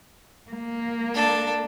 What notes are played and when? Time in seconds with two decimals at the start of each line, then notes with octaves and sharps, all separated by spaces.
0.51 A#3
1.14 D4 A4